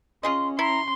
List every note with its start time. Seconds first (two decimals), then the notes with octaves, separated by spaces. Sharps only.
0.23 C#4 F4 G#4 D#5 C6
0.59 E4 A#5 C6